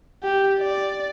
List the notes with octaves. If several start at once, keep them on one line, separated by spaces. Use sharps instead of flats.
G4
D5